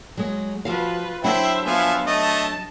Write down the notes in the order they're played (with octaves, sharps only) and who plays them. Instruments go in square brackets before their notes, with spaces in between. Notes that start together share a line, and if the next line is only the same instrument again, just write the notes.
[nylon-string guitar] F#3 G#3
[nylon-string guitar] F3 F#4 F5 [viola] F4 B4
[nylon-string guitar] F#3 D4 F#5 [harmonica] E4 G5 [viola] C5 E5
[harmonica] F3 E5 G#5 [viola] B3 F5
[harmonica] A3 D#5 [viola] A5